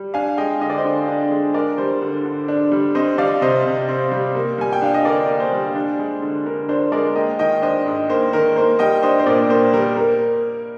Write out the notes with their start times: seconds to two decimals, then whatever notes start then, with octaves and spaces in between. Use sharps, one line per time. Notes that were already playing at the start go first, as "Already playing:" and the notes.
Already playing: G3
0.14 D4 F5 G#5
0.38 G#3 D#5 G5
0.61 D3 D#5
0.70 D5
0.78 C5 D#5
0.85 D3
1.08 D4
1.31 G#3
1.54 D4 A#4 D5
1.78 G3 C5
2.02 D3
2.25 D3
2.48 D4
2.72 G3
2.95 C4 C5 D#5
3.18 G3 D5 F5
3.41 C3 C5 D#5
3.65 C3
3.89 C4
4.12 G3
4.35 A#3
4.58 G3 G#5
4.73 G5
4.82 D4 F5
4.94 D#5
5.05 D3 A#4 D5
5.29 A#3
5.40 C5
5.52 G3
5.76 D4
5.99 G#3
6.22 D3
6.46 D3 A#4
6.69 D4 C5
6.92 G#3 A#4 D5
7.15 A#3 D#5 G5
7.39 D#3 D#5 G5
7.62 D4 C5 D#5
7.86 G#2
8.10 A#3 C5
8.33 D#3 A#4
8.56 A#3 C5
8.79 G3 D#5 G5
9.03 D4 C5 D#5
9.19 C5
9.26 A#2 A#4 D5
9.50 A#3 C5
9.73 G3 A#4
9.96 A#3 A#4